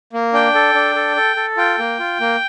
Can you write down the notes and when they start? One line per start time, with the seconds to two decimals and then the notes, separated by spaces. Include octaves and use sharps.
0.13 A#3
0.33 D4 G5
0.55 A4
0.74 D4
0.95 A4
1.16 A4
1.36 A4
1.57 F4 G5
1.79 A#3
1.99 F4
2.20 A#3